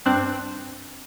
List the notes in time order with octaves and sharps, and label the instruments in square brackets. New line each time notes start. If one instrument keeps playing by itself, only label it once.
[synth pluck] G2 C4 D4 F#6